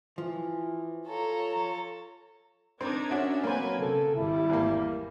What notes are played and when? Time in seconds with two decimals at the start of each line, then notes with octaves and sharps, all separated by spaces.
0.18 E3 F3
1.08 F4 A4 C#5 A#5
2.81 C4 D4 D#4 A#4 G#6
3.11 C#4 D4 F#4 E5
3.44 F#3 A#3 C4 B4 G#5
3.80 C#3 A4
4.15 G#1 G3 E4
4.50 E2 A#3